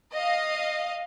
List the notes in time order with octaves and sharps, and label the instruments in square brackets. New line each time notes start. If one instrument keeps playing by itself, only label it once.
[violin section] D#5 F5